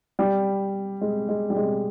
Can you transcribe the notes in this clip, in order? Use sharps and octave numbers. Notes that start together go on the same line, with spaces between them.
G3
G#3
G#3
G3
G#3